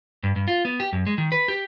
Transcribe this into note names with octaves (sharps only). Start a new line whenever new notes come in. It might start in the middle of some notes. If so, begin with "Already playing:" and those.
G2
G2
F4
B3
G4
F#2
G#3
D#3
B4
G4